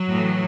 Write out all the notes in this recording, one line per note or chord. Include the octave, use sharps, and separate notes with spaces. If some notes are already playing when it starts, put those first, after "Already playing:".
Already playing: F#3
A2 E3